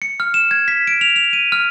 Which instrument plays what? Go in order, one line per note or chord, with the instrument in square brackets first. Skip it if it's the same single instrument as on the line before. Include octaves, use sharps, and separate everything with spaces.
[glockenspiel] C#7
F6
E7
G#6
B6
D7
F7
F7
D#7
F6